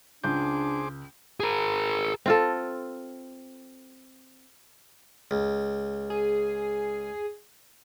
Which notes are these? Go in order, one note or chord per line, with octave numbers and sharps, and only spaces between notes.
C#2 D4 G#4 C5 D6 G6
G#4 A#4
C4 F4 A4
C#2
G#4